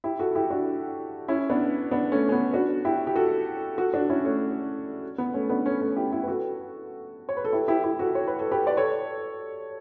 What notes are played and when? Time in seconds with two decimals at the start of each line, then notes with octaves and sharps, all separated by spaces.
0.04 E4 G4
0.19 F#4 A4
0.35 E4 G4
0.50 D4 F#4
1.28 C#4 E4
1.50 B3 D4
1.91 B3 D4
2.12 A3 C#4
2.29 C#4
2.32 B3
2.53 D4 F#4
2.85 E4 G4
3.07 G4
3.16 F#4 A4
3.78 F#4 A4
3.94 D4 F#4
4.09 C#4 E4
4.25 A3 C#4
5.18 B3
5.34 A3 C#4
5.50 B3 D4
5.65 A3 C#4
5.81 A3 C#4
5.96 E4 G4
6.12 E4 G4
6.23 B4
6.28 F#4 A4
7.29 C#5
7.37 B4
7.45 A4
7.52 E4 G4
7.68 E4 G4
7.84 E4 G4
7.99 F#4 A4
8.15 C#5
8.27 B4
8.39 A4
8.51 G4 B4
8.67 D5
8.77 A4 C#5